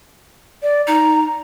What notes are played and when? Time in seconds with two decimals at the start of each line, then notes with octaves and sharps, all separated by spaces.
0.63 D5
0.87 D#4 A#5